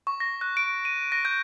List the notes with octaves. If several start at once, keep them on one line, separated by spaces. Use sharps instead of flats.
C#6
A#6
F#6
D7
D#7
A#6
G6